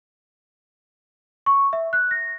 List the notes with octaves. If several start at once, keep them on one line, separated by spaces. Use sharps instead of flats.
C#6
E5
F#6
A#6